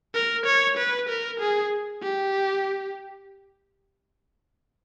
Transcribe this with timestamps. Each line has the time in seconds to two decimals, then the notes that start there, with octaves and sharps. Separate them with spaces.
0.15 A#4
0.46 C#5
0.77 B4
1.09 A#4
1.40 G#4
2.02 G4